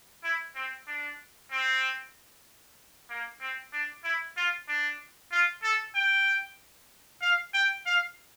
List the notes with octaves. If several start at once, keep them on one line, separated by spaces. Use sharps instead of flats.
E4
C4
D4
C4
A#3
C4
D4
E4
F4
D4
F4
A4
G5
F5
G5
F5